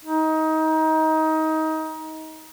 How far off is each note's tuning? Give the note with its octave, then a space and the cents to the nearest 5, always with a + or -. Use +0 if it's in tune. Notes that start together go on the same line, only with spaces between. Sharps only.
D#4 +25